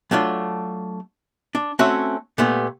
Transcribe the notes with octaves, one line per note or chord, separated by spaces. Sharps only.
F#3 A3 D4 F4
D4
A3 C4 C#4 F#4 C#5 E5
A#2 A3 B3 G4